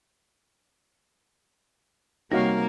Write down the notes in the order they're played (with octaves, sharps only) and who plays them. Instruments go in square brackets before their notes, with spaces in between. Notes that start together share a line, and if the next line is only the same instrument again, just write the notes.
[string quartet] C3 A#3 A#4 [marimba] G3 C#5 [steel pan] D#4 F#4 F5